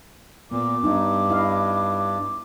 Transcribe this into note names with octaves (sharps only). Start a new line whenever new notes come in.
A#2 B3 D6
G2 D4 D#4
E4 D#5 F5